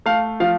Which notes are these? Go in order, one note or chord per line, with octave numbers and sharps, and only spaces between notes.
A3 F5
F3 F5